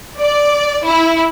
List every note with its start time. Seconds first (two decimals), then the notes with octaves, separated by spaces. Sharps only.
0.19 D5
0.86 E4